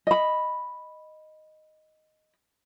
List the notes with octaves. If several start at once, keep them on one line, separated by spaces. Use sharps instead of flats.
D#5 B5